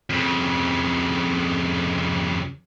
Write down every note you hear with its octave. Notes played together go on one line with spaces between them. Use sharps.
F2 C#3